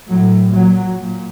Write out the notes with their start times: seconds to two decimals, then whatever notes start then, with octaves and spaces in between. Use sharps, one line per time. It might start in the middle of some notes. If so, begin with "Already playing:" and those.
0.09 A2 F#3
0.53 A#2 F#3
0.98 A#2